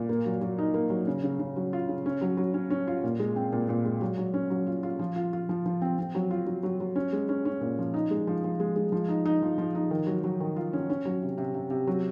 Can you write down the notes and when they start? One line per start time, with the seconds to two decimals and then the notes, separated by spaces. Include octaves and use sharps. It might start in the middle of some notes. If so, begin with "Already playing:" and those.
Already playing: A#2
0.09 A#3
0.26 F#3
0.41 F#3
0.58 D#4
0.74 A#3
0.90 F#3
1.07 C#3
1.24 C#3
1.39 C#3
1.56 F#3
1.73 F4
1.88 C#3
2.06 C#4
2.21 F#3
2.37 F#3
2.54 C#4
2.70 C#4
2.88 F4
3.04 A#2
3.19 G#3
3.36 C4
3.52 A#2
3.69 A#2
3.85 G#3
4.01 F#3
4.18 F#3
4.34 C#4
4.50 F#3
4.67 F4
4.83 F4
4.99 F3
5.16 F4
5.33 F4
5.49 F3
5.66 F3
5.82 C4
5.99 C4
6.15 F#3
6.31 F4
6.46 F#3
6.63 F#3
6.80 F#3
6.96 C#4
7.13 G#3
7.29 C#4
7.45 C#4
7.61 A#2
7.79 F3
7.94 D#4
8.11 G#3
8.27 F3
8.44 F3
8.60 G#3
8.76 G#3
8.92 F3
9.08 D#4
9.26 D#4
9.42 F3
9.58 F3
9.75 D#4
9.91 D#3
10.07 F#3
10.24 F#3
10.40 D#3
10.56 F4
10.73 C#4
10.90 C#4
11.05 F#3
11.22 C3
11.38 C3
11.54 C3
11.70 C3
11.87 F#3